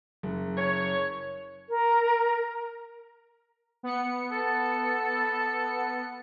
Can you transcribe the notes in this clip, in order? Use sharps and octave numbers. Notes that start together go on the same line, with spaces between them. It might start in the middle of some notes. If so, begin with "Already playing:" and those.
F#1
C#5
A#4
B3 C#7
A4